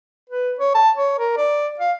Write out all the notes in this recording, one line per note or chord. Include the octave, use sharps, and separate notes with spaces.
B4
C#5
A5
C#5
A#4
D5
F5